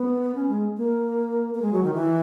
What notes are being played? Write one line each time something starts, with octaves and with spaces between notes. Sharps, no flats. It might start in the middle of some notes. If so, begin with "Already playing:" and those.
Already playing: B3
C#4
G#3
A#3
A#3
G#3
F#3
D#3
E3